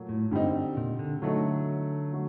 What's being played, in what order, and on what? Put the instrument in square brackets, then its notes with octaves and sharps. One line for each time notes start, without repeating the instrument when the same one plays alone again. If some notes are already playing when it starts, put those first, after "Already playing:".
Already playing: [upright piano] A#2 F#3 A3
[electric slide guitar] A2
[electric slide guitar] G2 [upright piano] D3 G3 C4 D#4
[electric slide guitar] A#2
D3
[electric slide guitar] D3 [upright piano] F#3 A3 D#4
[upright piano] F#3 A3